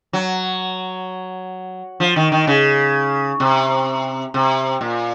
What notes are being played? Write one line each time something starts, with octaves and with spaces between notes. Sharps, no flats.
F#3
F3
D#3
D#3
C#3
C3
C3
A#2